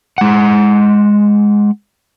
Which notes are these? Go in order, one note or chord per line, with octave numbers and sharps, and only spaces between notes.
G#3 F#5